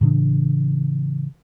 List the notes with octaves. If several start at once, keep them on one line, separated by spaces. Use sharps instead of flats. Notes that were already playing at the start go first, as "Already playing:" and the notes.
A2 C#3 E3 D4